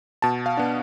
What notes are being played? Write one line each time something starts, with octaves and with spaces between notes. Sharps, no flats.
B2 A5
F5
B3 D4